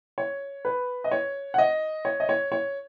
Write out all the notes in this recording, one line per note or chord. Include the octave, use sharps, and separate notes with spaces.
C#5
B4
D#5
C#5
F#5
D#5
C#5
D#5
C#5
C#5